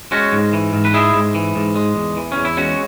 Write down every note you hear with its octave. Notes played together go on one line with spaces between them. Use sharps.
G#3 C#4 F#4
G#2
E3
G#2
B4
G#3 E4 G#4
G#2
E3
G#2
G#3
E2
E3
E2 C#4
E4
G#3 C#4 F#4